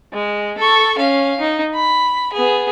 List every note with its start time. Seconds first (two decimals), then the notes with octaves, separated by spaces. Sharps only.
0.13 G#3
0.58 A4 C#6
0.98 C#4 F5
1.40 D#4
1.75 B5
2.33 B3 G#4